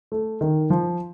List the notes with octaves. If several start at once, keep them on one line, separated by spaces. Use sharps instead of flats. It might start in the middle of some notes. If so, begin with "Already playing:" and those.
A3
D#3
F3